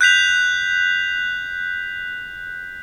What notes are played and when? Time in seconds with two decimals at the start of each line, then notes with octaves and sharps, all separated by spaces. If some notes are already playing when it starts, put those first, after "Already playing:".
0.01 F#6 G6 B6 F7